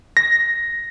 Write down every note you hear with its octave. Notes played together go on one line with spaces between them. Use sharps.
A#6